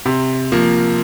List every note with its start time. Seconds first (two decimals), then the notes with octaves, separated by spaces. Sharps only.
0.06 C3
0.52 F3 A#3